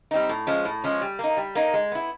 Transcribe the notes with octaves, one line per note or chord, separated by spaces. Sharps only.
G3 C4 D#4
A2
F3 G#3 C#4
A2
F3 G#3 C#4
G3
A#3 D#4
G3
A#3 D#4
G#3
B3 E4